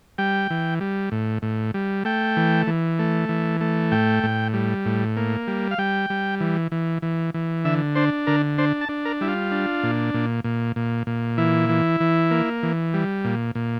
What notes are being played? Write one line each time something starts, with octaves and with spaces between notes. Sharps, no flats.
G3 G5
E3
G3
A2
A2
G3
A3 G5
E3
E3
A3
E3
A3
A2 G5
A2
G3
A2
A#3
G3
F5
G3 G5
G3
E3
E3
E3
E3
D3 E5
D4 C5
D3 A#4
D4 C5
A5
D4
A#4
G3 E4
F4
D4
A#2
A#2
A#2
A#2
A#2
E3 E4
E3
E3
A#3
E3
G3
A#2
A#2